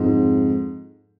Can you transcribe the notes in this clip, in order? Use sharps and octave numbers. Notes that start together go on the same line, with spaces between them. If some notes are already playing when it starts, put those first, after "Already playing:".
Already playing: F2 G#2